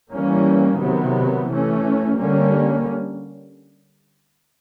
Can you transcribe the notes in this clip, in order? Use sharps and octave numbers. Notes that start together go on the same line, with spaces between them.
E3 G3 A#3 C#4
C3 D#3 F#3 B3
E3 A3 C#4
D3 G3 A#3 C#4